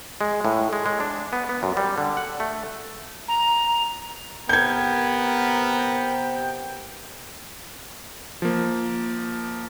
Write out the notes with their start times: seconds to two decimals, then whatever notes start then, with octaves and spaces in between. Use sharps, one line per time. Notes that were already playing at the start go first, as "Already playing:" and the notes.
0.21 G#3
0.45 A2
0.73 G#3
0.86 G#3
1.00 D4
1.33 B3
1.49 B3
1.63 F#2
1.77 G3
1.98 D3
2.17 F#5
2.40 A3
3.28 A#5
4.49 C3 B3 A#4 G5 G6 G#6
8.42 F3 A#3